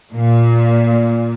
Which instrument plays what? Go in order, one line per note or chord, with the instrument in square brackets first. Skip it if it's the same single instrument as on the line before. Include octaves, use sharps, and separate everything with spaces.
[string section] A#2